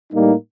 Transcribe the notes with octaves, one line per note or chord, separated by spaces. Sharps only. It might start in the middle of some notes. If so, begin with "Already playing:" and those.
A2 G3 A#3 D#4